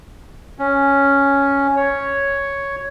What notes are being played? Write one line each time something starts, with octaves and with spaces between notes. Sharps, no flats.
C#4
C#5